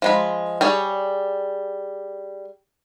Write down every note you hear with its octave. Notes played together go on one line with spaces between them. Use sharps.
F3 G#3 B5
G3 G#4 C#5